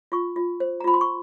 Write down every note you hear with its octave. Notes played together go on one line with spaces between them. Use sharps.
F4 C#6
F4
C5
A#5
F4 B5
C6
C#6